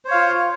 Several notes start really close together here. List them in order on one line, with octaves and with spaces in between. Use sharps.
C5 C#5 F5 F4